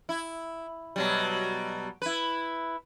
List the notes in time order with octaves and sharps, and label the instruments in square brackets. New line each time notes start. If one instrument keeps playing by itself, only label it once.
[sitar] E4
B2 F#3 G3
E4 B4